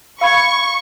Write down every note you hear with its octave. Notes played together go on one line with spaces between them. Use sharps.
F5 B5 C#6 G#6